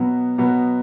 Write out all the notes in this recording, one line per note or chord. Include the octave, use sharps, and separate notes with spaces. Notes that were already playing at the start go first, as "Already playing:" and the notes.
Already playing: B2 F#3 B3
B2 F#3 B3